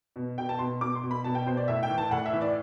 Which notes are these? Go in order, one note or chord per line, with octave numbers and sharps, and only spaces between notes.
B2
B2 G5
A5
B2 C6
B2 D6
C6
B2
B5
B2 A5
G5
B2 C5
D5
A2 E5
G5
E3
A5
A2 F#5
E5
E3
D5